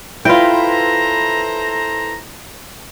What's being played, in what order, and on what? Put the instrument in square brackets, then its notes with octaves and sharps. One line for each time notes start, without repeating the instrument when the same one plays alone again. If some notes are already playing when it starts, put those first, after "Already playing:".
[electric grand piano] E4 B4 B5 [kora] F4 G5 [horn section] A4 C5 A#5